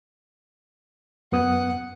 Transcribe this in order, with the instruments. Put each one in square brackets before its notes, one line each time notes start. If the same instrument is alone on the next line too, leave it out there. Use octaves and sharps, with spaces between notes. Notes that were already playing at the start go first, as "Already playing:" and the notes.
[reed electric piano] F#2 B3 D#6 [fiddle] F#5